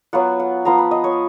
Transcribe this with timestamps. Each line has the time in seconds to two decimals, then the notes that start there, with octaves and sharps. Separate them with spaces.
0.13 F#3 B3 F4 F#5
0.40 F#5
0.65 F3 B3 F4 A#5
0.78 B5
0.91 D#5
1.04 C#5